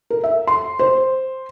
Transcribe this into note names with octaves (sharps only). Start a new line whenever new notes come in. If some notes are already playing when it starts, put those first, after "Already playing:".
A#4
E5
C6
C5